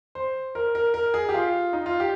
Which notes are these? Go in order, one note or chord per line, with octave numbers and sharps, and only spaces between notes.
C5
A#4
A#4
A#4
G#4
G4
F4
D#4
F4
G4